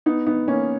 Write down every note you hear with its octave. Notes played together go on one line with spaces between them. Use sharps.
B3 D#4
B3 D#4
A#3 C#4